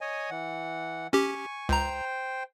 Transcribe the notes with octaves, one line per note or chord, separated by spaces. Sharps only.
C#5 D#5 G#5
E3 F#5
C#4 G4 G#5 C#6
C#2 C5 G5 A#5